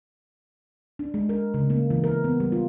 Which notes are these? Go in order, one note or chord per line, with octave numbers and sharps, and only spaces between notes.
D4
G#3
A#4
C#3
A#3
E3
A#4
B3
G3
F4